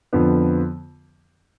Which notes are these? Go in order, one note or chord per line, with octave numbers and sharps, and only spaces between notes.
F2 D3 F3 B3